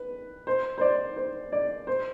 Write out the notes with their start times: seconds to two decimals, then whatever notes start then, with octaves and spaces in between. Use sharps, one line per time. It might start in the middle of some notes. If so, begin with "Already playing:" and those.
Already playing: B4
0.47 C5
0.78 C5
0.81 D5
1.16 C5
1.52 D5
1.87 C5